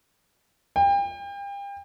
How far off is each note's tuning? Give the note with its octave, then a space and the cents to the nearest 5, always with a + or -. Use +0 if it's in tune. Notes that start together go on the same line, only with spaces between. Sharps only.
G5 +35